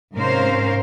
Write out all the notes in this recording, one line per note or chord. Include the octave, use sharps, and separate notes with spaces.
G#2 C3 C#4 A#4 C5 F5